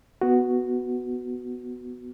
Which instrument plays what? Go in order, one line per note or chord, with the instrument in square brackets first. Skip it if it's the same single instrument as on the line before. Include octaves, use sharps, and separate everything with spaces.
[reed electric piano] B3 F#4